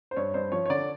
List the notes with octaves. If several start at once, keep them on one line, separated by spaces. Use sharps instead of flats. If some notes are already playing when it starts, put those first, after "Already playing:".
C5
G2 C#5
G2 C5
F3 C#5
C#5
D3 D5